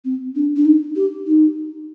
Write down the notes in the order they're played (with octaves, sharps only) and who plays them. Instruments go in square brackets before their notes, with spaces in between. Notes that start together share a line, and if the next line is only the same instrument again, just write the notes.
[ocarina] C4
D4
D4
D#4
G4
D#4